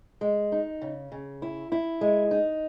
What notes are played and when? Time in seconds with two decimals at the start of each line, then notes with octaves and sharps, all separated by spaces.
0.21 G#3
0.52 D#4
0.81 C#3
1.12 C#3
1.42 E4
1.72 E4
2.01 G#3
2.31 D#4